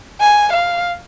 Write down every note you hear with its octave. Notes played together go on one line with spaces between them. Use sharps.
G#5
F5